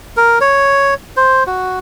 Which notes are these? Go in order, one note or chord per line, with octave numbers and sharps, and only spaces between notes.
A#4
C#5
C5
F#4